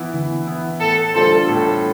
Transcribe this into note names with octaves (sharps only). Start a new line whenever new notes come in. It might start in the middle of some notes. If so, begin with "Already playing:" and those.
Already playing: E3 B3 E4
E3
B3 E4
A2 A4
G3 D4 F4 A4 C5
A2